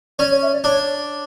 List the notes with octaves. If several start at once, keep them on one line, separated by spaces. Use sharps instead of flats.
C#4 D5
C#5
E5
D5
D4 C#5